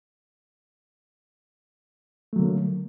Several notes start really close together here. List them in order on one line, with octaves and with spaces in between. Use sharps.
A3 F#3 D3 A#3